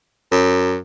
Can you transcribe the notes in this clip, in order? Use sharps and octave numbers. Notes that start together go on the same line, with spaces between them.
F#2